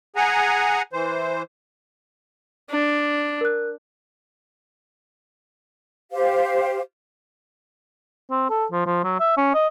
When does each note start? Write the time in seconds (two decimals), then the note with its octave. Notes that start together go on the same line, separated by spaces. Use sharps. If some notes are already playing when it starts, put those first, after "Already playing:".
0.16 G#4 F#5 G#5 A#5
0.93 E3 C5
2.70 D4
3.41 A#4 F#6
6.12 G4 C5 F5
8.30 C4
8.50 A4
8.72 F3
8.86 F3
9.04 F#3
9.20 E5
9.37 C#4
9.54 D#5